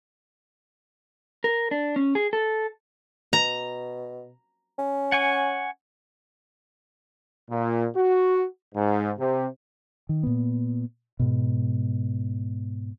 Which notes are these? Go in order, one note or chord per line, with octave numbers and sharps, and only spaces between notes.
A#4
D4
C#4
G#4
A4
B2 A#5
C#4
F#5 G#5 C#6
A#2
F#4
G#2
C3
D#3
A#2 B3
G#2 B2